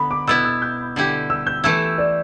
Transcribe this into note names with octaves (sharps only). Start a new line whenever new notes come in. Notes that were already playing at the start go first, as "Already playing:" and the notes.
Already playing: D3 B3 B5
D6
B2 B3 E4 E6
E6
G6
D3 G3 E4 G4
E6
G6
E3 A3 E4 E6
D5